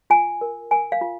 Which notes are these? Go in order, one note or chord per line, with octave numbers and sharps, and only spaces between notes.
F4 G#5
A#4
A#4 G#5
F5
F4